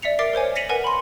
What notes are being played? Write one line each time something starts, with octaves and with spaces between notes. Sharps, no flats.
D5 E5 B6 C#7 F7
A#4 E5 D6 A6 C7 D7
A#4 C5 C#5 G#5
A#6 B6 C#7 D#7 F7 F#7
A#4 B4 F#5 G#5
B5 C6